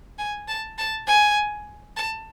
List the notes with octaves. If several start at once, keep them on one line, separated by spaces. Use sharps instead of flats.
G#5
A5
A5
G#5
A5